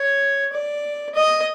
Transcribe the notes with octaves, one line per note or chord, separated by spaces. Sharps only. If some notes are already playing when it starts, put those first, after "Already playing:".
Already playing: C#5
D5
D#5